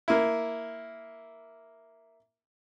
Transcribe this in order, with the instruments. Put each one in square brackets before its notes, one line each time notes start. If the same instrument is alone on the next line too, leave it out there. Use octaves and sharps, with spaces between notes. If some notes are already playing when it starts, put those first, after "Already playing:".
[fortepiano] A#3 E4